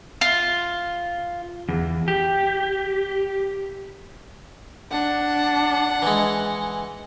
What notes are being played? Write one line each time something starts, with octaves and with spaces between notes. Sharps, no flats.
F4
E2
G4
D4 F#5
E3 G#3